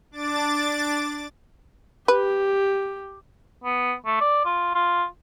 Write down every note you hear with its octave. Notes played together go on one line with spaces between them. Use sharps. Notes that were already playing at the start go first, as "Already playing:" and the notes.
D4 D6 A6
G4 B4
B3
A3
D5
F4
F4